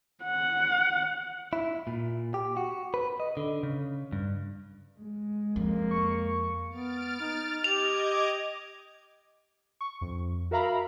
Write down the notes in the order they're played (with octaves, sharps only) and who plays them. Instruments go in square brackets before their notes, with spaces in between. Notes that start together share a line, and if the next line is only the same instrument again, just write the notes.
[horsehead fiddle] F#5
[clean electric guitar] E4
A#2
G4
F#4
B4
D#5
D3
C#3
G2
[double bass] G#3
[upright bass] F2 [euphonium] A#3
[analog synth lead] C#6
[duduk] B3 [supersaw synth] F6 A6 D7
[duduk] D#4
[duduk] G4 [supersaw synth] D#5 D6 G#6 [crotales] F7
[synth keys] C#6
F2
F#4 A#4 E5 F5 A#5 B5